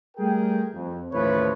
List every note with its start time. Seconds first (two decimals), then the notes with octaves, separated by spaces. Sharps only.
0.18 G3 A3 G#4 A#4 G5
0.73 F2
1.12 A1 D#2 F3 A3 B4 C#5